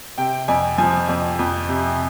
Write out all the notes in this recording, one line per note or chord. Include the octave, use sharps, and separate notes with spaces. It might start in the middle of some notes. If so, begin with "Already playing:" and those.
C3 G5
F2 G#5
F3 G#5
F2
F2
C3